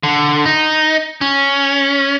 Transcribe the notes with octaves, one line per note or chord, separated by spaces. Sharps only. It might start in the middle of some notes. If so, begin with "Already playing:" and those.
D3
D#4
C#4